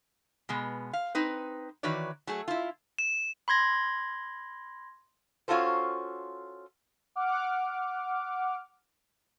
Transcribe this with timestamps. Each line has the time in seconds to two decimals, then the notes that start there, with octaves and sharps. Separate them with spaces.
0.49 B2 G#3 B3
0.93 F5
1.15 C4 D#4 B4
1.83 D#3 E3 F#4 B4 C#5 D5
2.27 F#3 A3 G#4
2.48 E4 F4
2.99 E7
3.48 B5 C6 G#6 A#6
5.48 C#4 F4 F#4 A4 C5
7.16 F#5 D6 F6